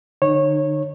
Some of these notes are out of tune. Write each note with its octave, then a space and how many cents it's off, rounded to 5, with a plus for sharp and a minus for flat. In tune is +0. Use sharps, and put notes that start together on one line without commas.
D3 +25 D#4 -30 C#5 -20